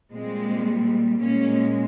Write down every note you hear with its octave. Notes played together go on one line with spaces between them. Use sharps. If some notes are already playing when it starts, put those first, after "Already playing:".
A#2 G3 G#3 C4
A#2 G#3 A#3 C#4